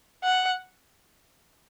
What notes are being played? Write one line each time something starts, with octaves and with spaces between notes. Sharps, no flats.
F#5